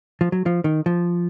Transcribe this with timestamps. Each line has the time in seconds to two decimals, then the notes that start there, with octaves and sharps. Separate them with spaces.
0.21 F3
0.32 F#3
0.46 F3
0.64 D#3
0.86 F3